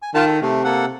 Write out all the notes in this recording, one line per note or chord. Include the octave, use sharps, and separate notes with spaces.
G#5
D#3 F4 A5
A4
C3 A3
A#3 A4 F#5